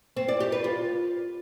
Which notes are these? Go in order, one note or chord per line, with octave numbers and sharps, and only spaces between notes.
C4
D5
G4
B4
F4